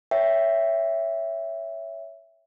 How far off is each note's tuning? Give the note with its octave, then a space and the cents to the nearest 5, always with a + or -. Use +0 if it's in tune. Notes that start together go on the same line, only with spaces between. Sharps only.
C#5 +10 E5 +5 G5 +0